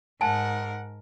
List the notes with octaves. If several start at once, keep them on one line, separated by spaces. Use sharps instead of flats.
G#2 A#4 F#5 G#5 A5